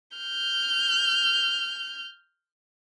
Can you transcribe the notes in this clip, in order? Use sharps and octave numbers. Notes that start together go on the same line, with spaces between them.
F6 G6